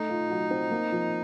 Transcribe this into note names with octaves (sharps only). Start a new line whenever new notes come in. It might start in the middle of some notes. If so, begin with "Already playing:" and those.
Already playing: A3 D#4
F4
F#3
C4
A#3
F3